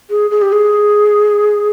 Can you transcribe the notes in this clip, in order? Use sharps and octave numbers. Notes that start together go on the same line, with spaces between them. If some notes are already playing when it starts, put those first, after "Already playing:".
G#4
G#4
G4
G#4